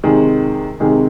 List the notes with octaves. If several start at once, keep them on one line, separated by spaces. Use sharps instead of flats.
C3 D#3 G#3
C3 D#3 G#3